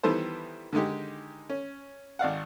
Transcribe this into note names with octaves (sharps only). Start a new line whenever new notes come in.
D#3 E3 G3 B3 A4 C5
D3 D#3 G#3 D#4 G4
C#4
G#1 D5 F5 F#5